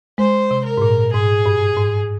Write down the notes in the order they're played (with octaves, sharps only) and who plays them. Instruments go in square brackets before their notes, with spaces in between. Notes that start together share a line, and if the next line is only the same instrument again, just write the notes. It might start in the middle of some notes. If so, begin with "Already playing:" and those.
[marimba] G#3 [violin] C5
[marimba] C3
[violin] A#4
[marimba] G#2
A#2
[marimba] G#2 [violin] G#4
[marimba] G2
G#2